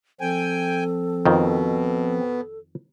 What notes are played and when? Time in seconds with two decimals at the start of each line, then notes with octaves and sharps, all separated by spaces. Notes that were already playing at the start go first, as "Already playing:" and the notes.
0.21 F3 C4 A4 G5 G#5
1.26 F2 B2 D#3